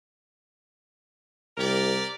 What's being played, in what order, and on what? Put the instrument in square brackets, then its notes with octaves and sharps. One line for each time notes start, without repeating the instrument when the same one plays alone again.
[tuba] C2 [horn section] G4 A#4 D5